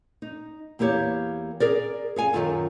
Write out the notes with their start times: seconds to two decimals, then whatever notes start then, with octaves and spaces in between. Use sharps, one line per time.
0.22 D#4
0.79 E2 A#3 E4 G4 C#5
1.60 G#4 A#4 D5
2.16 G#4 F5 G#5
2.33 F#2 B2 D#3 F4 A4